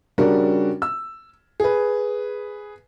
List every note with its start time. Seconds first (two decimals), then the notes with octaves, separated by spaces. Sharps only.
0.18 C#3 G3 C#4 D4 F#4 A#4
0.82 E6
1.60 G#4 B4